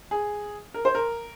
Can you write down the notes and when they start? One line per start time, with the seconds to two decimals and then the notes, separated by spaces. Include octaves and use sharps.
0.11 G#4
0.74 A#4
0.85 C5
0.95 A#4